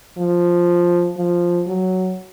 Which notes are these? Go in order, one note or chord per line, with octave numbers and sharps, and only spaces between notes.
F3
F3
F#3